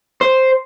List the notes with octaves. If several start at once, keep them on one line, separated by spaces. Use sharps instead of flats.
C5